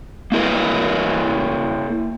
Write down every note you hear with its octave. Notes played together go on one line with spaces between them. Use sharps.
A#3 E4 A#4 B4